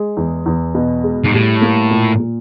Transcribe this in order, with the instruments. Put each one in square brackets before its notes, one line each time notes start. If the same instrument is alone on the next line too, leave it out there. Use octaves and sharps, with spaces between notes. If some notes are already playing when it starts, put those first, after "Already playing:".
Already playing: [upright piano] G#3
E2
E2
B2
G#3
[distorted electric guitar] G#2
[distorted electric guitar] A2 [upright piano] G3
[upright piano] A#3
A#2
A#2